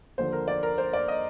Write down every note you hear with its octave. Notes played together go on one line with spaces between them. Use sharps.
D#2 D3 F3 C5
A#4
D5
A#4
C5
D5
D#5